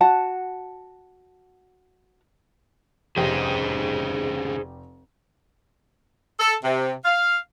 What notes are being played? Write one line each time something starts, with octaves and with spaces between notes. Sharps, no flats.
F#4 F#5 A5
F1 D#2 C#3 G4 G#4 C5
A4
C3
F5